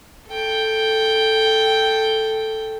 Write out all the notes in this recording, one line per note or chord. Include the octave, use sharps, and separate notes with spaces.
A4 G5